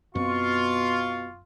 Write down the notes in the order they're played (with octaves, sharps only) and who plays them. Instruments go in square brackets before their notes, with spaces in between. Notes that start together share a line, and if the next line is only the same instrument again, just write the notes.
[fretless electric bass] F#2 C4 [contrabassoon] B2 [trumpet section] F4 [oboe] C#6